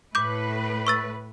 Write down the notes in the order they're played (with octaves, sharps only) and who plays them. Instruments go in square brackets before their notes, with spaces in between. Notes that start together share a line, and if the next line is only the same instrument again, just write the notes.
[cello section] A2 B4 [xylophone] D6 G6
[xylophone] C#6 E6 A6